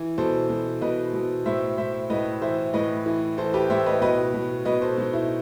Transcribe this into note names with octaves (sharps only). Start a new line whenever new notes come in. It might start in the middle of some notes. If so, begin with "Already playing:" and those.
Already playing: E3
B2 A4 C5
B2
B2 B4 D#5
B2
A2 C5 E5
A2 C5 E5
A2 B4 D#5
E3 C5 E5
A2 B4 D#5
E3
E3 A4 C5
G4 B4
A2 C5 E5
B4 D#5
B2 B4 D#5
B2
B2 B4 D#5
A4 C5
B2 D#4
E4